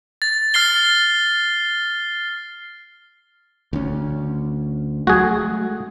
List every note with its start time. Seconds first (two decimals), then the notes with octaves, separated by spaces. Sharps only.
0.22 A6
0.54 F6 A6 C7 G7
3.73 D2 C#4
5.07 F#3 G#3 A3 F#4 G#4